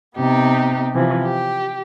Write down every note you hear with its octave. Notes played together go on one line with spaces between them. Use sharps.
C3 B3 D#4 G4
C3 E3 F3
G4